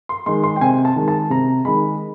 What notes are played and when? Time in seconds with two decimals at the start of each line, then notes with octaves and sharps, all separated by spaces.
0.09 C6
0.26 D#3 G#3 C6
0.44 C6
0.56 G5
0.61 C3 G#5
0.85 A5
0.96 D#3 G#3
1.08 A5
1.30 C3 A#5
1.65 D#3 G#3 B5